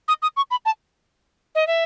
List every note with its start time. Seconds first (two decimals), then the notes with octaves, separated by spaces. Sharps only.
0.08 D#6
0.22 D#6
0.37 C#6
0.51 B5
0.65 A5
1.55 D#5
1.67 E5